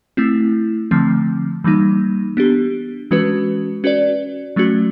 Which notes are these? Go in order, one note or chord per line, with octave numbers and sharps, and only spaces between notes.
A3 C4 E4
D3 F3 A3 C4
E3 G3 A#3 D#4
B3 D4 G4
E3 G#3 C#4 F#4 B4
C#4 F#4 B4 D5
F#3 A3 C#4 F#4